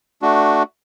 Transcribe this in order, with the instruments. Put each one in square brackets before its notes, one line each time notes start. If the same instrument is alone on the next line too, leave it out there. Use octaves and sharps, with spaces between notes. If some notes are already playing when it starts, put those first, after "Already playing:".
[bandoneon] A3 D4 F#4